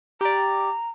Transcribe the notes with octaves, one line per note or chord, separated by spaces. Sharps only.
G4 D5 A#5